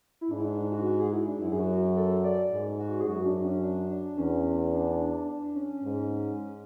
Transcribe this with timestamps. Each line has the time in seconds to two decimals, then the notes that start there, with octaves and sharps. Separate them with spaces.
0.21 E4
0.31 G#2 D4
0.38 E4
0.45 D4
0.59 D4
0.72 F#4
0.86 F#4
1.00 G#4
1.13 E4
1.27 D4
1.41 F#2 E4
1.52 G#4
1.60 F#4
1.97 A4
2.24 D5
2.52 G#2
2.79 F#4
3.01 G#4
3.07 F#2 F#4
3.26 D4
3.44 C#4
3.63 D4
3.90 D4
4.17 E2 C#4
4.73 D4
4.92 D4
5.10 D4
5.28 D4
5.55 C#4
5.83 G#2